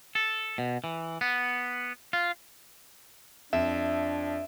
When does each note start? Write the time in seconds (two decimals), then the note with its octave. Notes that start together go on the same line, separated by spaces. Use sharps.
0.15 A4
0.58 B2
0.84 E3
1.21 B3
2.13 F4
3.53 F2 D4 E5